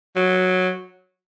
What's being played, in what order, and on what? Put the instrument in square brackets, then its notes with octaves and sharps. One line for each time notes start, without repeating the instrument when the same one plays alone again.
[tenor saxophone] F#3